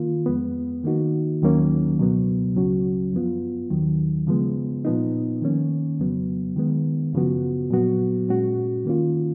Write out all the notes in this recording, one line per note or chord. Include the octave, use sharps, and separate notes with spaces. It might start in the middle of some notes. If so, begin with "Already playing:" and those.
Already playing: D#3 A#3 F4
F2 F3 G#3 B3
D#3 A#3 D#4 F#4
D#2 D#3 F#3 A#3 C#4
C#2 B2 F#3 B3
C#2 C#3 F#3 C#4 F#4
F#2 F3 B3 F4
D#2 D#3 F#3
C#3 F3 G#3 B3
A#2 F3 B3 D#4
D#3 A#3 C#4
F2 C#3 F#3 B3
D#3 G#3 B3
F#2 C#3 F3 B3 F#4
A#2 F#3 B3 F#4
A#2 G#3 C#4 F#4
D#3 A#3 C#4 F4